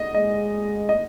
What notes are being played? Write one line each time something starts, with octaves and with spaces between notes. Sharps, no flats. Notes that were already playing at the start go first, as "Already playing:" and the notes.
Already playing: D#5
G#3 D#5
D#5